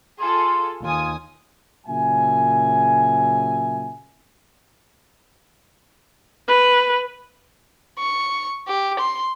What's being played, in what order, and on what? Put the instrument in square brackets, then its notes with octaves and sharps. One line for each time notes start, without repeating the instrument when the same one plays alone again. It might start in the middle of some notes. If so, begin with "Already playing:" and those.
[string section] F4 G#4 A4 [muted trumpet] C6
[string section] D#2 G#5 D#6 [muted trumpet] F4
[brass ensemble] A#2 C#3 F#3 E5 G#5
[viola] B4
[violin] C#6
G4
C6